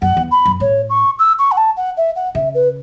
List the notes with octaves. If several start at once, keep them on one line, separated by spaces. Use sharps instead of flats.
F#2 F#5
E2
B5
F#2
A2 C#5
C#6
E6
C#6
F#5
A5
F#5
E5
F#5
C#3 E5
B4